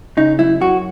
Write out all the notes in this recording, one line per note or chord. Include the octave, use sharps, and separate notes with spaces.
C#3 D#4
F#2 E4
F#2 F#4